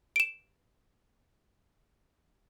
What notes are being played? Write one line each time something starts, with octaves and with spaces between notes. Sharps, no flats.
D7 E7